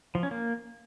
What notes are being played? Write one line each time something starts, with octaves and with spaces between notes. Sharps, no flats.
F3
C#4
A#3